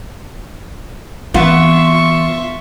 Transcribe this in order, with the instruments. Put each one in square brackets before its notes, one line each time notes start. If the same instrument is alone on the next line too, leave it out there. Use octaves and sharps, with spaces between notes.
[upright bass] E3 C4 [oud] B3 [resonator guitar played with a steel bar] F4 [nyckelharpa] E5 C#6